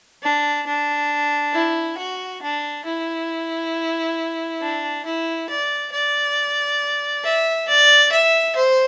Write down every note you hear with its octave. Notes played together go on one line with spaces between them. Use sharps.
D4
D4
E4
F#4
D4
E4
D4
E4
D5
D5
E5
D5
E5
C5